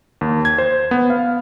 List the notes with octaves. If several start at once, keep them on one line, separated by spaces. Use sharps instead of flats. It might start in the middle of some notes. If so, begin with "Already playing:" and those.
D#2
G#6
C5
B3
F5